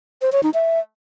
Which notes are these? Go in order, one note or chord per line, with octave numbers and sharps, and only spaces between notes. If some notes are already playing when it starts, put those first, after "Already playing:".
C5
C#5
D#4
E5